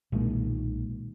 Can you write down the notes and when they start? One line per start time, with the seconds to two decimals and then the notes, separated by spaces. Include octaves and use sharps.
0.12 B1 A#2 D#3 G#3